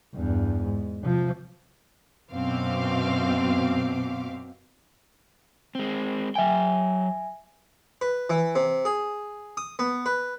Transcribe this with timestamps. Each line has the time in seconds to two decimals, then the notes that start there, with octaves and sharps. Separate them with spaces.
0.15 E2 G2
0.63 G#2
1.02 C3 F3
2.32 F#2 B2 C4 F5 D6
5.75 G#3 C4
6.35 F#3 E5 G5 G#5
8.01 B4
8.30 E3
8.55 C3
8.85 G#4
9.57 D#6
9.79 B3
10.06 B4